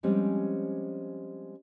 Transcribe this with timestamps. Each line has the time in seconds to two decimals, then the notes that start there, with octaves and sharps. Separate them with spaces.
0.03 F3 G3 G#3 C4 C#4 G4